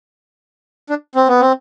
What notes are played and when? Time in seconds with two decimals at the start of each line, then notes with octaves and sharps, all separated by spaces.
0.89 D4
1.15 C4
1.28 B3
1.41 C4